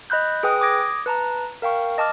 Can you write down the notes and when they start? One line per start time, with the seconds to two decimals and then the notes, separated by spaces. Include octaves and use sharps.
0.10 D#5 B5 F#6 G6
0.43 G#4 B4 G5 D#6
0.61 D6 D#6 G#6 A#6 D7
1.06 B4 A5 A#5
1.62 A#4 F5 G5 C#6
1.98 D#5 A5 D6 F6